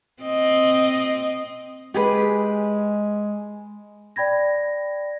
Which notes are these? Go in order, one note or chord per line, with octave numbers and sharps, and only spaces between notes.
C4 D#5
G#3 G4 G#4 B4
D5 G5 B5 G#6 A#6